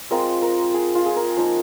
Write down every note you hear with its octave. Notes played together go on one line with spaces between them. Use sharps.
G#3 C4 F4 A#4
A#4
G#4
F4
G#4
A#4
F3 A#3 D#4